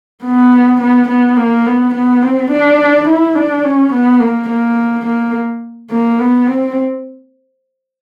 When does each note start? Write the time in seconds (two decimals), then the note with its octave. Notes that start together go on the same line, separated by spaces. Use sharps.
0.24 B3
0.81 B3
1.09 B3
1.37 A#3
1.66 B3
1.94 B3
2.22 C4
2.51 D4
3.08 E4
3.35 D4
3.65 C#4
3.93 B3
4.20 A#3
4.49 A#3
5.06 A#3
5.91 A#3
6.19 B3
6.47 C4